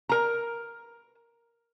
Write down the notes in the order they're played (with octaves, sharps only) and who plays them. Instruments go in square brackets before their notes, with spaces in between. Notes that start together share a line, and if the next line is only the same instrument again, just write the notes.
[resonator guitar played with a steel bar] A#4 A#5